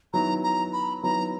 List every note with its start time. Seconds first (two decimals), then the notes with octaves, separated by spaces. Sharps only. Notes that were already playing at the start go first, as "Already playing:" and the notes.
0.13 D#3 F#3 B3 E4 A#5
0.43 A#5
0.73 B5
1.03 D#3 F#3 B3 E4 A#5